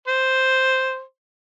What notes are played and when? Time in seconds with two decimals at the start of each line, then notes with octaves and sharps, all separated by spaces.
0.08 C5